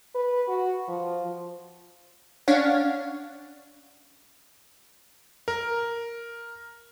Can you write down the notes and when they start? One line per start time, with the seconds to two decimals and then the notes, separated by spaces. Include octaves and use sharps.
0.15 B4
0.48 F#4
0.88 F3
2.48 C#4 D4 C#5 F5 F#5
5.48 A#4